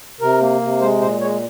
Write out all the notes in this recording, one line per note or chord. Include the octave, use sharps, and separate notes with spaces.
C3 A#4
A#3
C3
G#3 C5
A#2 C5
G#3 C#5